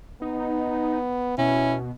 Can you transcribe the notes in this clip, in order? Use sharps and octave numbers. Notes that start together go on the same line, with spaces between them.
B3 D#4
B2 C#4 E4